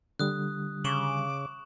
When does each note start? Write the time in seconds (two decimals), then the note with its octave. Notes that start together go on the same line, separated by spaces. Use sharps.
0.19 D3 G3 D#6 F#6
0.84 C#3 C#6 D6 E7 F#7